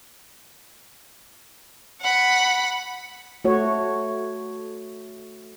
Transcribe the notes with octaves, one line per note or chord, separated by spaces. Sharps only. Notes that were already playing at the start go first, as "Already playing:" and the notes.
F#5 B5
A3 F#4 C#5